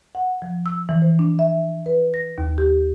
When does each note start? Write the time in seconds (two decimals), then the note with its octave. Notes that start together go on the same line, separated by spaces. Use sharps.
0.15 F#5
0.42 F3
0.66 E6
0.89 E3
1.02 C5
1.19 D4
1.39 E5
1.86 B4
2.14 A#6
2.38 D#2
2.58 G4